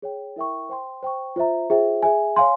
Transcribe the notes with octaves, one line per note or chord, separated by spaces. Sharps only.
G#4 C#5 G5
E4 A#4 E5 G5 C#6
C5 G5 C6
C5 G5 C#6
F4 C5 E5 A#5
F4 G#4 C5 E5 G5
G#4 E5 G#5
C#5 F5 G#5 C6